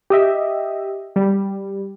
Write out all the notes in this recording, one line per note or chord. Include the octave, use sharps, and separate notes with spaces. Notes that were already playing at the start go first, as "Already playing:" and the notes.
G4 D#5 E5
G3